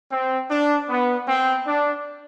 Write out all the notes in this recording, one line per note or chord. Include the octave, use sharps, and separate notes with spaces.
C4
D4
B3
C4
D4